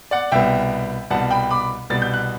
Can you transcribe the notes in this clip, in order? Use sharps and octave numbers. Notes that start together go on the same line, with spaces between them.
D5 F#5
C2 B2 G3 B3 E5 G5
C2 B2 G3 B3 F#5 A5
G5 B5
B5 D6
C2 B2 G3 B3 A6
G6
F#6